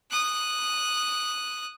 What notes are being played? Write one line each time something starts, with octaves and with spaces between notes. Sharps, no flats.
D#6 F#6